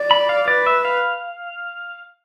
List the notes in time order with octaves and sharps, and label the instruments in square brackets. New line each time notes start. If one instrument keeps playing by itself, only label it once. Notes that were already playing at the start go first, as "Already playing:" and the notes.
Already playing: [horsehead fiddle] D5
[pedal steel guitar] B5
F5
[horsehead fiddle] B4 [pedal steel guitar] D5
[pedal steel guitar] E5
F5